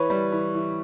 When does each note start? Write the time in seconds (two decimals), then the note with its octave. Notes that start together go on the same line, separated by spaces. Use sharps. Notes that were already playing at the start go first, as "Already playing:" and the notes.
Already playing: E3 B4 C#5
0.10 G3
0.32 E3
0.55 E3